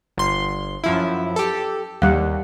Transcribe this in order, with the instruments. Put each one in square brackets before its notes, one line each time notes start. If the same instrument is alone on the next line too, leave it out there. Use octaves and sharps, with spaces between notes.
[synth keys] G1 C6
F#2 F3 E4
G4 A4
[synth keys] D#2 [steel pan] G3 F5 F#5